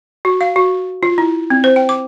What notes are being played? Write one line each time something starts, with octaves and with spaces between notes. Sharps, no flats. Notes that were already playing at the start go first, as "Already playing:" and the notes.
F#4
F5
F#4
F4
E4
C4
C5
G5
D6